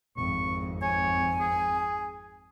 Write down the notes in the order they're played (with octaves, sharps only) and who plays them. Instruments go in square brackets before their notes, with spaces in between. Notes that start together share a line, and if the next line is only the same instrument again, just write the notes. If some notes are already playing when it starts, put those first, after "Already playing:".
[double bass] G#1 F2 [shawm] C#6
[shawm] C#5 [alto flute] G#5
[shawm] G#4